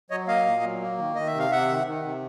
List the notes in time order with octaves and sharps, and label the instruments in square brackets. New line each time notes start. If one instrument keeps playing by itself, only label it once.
[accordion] F#3 C#5 D#5
A#3 D#5 F5
A#2
F#3
A#3
D#3
D#3 D#5
E5
C3 F5
C3 E5 F#5
D#3
D#3
C3